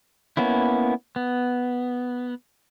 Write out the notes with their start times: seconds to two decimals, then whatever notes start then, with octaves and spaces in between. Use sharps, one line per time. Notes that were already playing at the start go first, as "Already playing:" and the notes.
0.37 A#3 B3 C#4 E4
1.16 B3